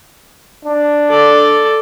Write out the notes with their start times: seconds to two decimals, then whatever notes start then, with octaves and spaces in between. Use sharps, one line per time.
0.65 D4
1.09 A4 D5